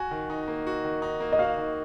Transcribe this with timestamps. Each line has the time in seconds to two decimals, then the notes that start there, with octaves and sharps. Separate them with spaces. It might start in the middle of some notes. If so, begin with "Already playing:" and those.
Already playing: F#4 G#5
0.11 D#3
0.30 D#4
0.48 A#3
0.67 F#4
0.84 D#3
1.02 D#4
1.20 A#3
1.32 D#5
1.39 F#4 F5
1.58 D#3